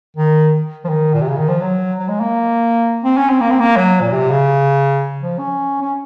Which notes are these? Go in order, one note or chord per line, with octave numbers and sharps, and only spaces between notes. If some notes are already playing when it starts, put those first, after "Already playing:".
D#3
F3
D#3
A#2
C3
C#3
D#3
F3
F#3
F#3
G#3
A#3
C4
C#4
C4
A#3
C4
A#3
F#3
A#2
C3
C#3
F3
C#4
C#4